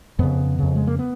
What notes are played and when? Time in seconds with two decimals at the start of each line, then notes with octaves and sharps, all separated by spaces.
0.19 F2 C#3 B3
0.59 F2 C#3
0.76 G#3
0.87 A#3
0.99 B3